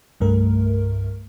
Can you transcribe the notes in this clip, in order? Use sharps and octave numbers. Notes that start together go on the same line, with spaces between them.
C2 G2 D3 A3 A#4